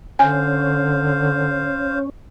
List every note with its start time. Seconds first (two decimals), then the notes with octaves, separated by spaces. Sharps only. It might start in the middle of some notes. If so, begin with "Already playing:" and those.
0.19 D3 C#4 C5 F5 G#5